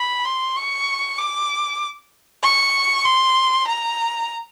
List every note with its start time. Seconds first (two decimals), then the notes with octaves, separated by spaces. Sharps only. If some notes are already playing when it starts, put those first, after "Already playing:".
Already playing: B5
0.25 C6
0.56 C#6
1.18 D6
2.43 C#6
3.05 C6
3.67 A#5